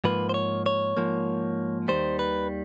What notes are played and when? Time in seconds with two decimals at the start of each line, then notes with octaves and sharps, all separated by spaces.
0.04 G#2 F3 A#3 B4
0.29 C5
0.34 C#5
0.66 C#5
0.97 G#2 F3 A#3
1.88 D#2 D#3 G3 C5
2.19 B4